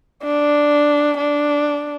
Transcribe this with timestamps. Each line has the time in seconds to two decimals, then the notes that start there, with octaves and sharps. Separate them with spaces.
0.23 D4
1.18 D4